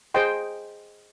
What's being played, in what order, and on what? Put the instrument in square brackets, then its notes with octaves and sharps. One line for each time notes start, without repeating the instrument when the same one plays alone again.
[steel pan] G#4 C5 D#5 G5 C6